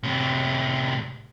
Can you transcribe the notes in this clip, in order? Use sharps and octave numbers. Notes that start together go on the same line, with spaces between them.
A2 C3